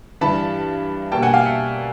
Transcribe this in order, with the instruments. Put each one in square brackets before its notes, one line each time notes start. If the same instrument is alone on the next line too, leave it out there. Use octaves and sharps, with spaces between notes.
[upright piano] G2 E3 G3 A5 B5
B2 G3 A#3 D4 G5 A5
F#5 G#5
F5 G5
E5 F#5